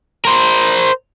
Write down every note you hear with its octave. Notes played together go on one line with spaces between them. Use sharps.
A#4 C5